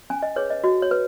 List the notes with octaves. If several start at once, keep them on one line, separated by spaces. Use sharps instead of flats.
C#4 G#5
D#5
G#4 B4 C#5
D#5
F#4 D#5
C#5
B4